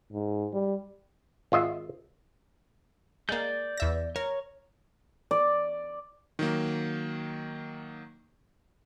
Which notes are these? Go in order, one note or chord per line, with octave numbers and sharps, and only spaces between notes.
G#2
G3
G#1 F4 D#5 E5
G#3 A#3 D5 G6
E2 E5 A#6
A#4 C#5
D5
D#3 F#3 A#3